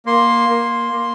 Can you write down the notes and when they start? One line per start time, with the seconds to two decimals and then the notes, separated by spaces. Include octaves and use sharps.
0.06 A#3 C6
0.49 A#3
0.93 A#3